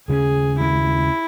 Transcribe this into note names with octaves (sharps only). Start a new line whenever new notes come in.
D#2 C#3 G#3 C#4 G#4
D#2 C#3 G#3 C#4 E4